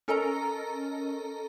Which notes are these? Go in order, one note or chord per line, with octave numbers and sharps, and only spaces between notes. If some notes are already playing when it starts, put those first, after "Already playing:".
C#4 A4 A#4 D#5 A#5